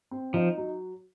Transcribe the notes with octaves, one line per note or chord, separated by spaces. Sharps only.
C4
F3 D#4
F#3